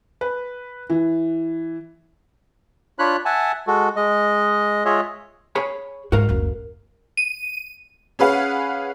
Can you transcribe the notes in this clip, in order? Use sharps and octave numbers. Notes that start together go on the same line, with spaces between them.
B4
E3
D4 F4 C#5 B5 F#6
E5 F#5 G#5 A5
G#3 F#4 A4
G#3 D#5
G#3 F4 G#4 C#5 D#5 E5
G#4 C#5 B5
G#2 F#4 A#4 F5
F#1 D2
D#7
C#4 G#4 B4 F5 F#5